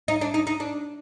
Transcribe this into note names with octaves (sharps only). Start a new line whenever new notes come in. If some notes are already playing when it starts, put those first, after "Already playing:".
D#4
D4
D#4
D#4
D4